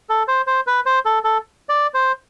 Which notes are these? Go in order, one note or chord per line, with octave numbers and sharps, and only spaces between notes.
A4
C5
C5
B4
C5
A4
A4
D5
C5